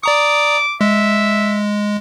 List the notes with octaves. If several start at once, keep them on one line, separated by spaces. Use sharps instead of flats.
D5 A#5 D6 D#6
G#3 E5